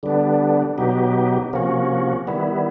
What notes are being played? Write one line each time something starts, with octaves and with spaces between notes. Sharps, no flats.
D3 G3 B3 D4
B2 F#3 B3 D#4 G4
C3 F3 A#3 C#4 F#4
D#3 G3 B3 E4